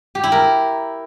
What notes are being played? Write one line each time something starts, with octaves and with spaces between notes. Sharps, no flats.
G4
E4
A#4